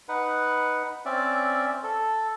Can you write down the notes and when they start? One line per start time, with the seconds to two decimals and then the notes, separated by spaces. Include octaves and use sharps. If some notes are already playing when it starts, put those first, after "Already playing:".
0.09 D#4 B4 F#5
1.05 C4 C#4 D5 E5
1.83 A4